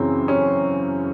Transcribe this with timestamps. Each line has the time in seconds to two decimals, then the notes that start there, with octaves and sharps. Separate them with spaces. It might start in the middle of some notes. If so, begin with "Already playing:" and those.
Already playing: F#2 C#3 E3 C4
0.28 C#4